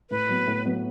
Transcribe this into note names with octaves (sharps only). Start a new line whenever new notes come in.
A2 B4
F#3 B3
A2
F#3 B3